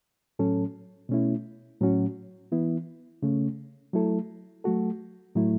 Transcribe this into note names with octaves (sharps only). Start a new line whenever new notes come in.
A2 F#3 C#4 A4
B2 A3 C#4 E4
A2 F#3 C#4 F#4
E3 B3 E4
C#3 A3 C#4
F#3 A3 E4 A4
F#3 A3 F#4 A4
A2 F#3 A3 E4